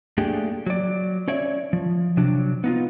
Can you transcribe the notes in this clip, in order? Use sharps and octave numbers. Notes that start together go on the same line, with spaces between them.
A3 A#3 D4 G4 G#4
F#3 D5
C#4 C#5 D5 E5
F3
C3 F#3 D4
B3 D#4 F4